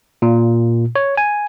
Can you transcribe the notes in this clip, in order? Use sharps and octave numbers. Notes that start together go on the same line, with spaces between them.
A#2
C#5
G#5